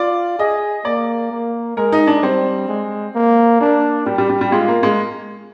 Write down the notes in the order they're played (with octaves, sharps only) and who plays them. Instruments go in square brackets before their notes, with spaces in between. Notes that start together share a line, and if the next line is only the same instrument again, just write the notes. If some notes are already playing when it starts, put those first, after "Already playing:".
Already playing: [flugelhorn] F4 [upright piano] D5
[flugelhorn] G#4 [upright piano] D#5
[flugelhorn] A#3 [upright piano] D5
[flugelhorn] A#3
[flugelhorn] G#3 [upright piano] A#4
[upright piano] D#4
D4
[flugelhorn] G3 [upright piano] C4
[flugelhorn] G#3
A#3
[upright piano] A#3 [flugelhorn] D4
[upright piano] G3 [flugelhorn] G4
[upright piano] G3
G3
G3
[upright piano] G#3 [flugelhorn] F4
[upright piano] A#3
G#3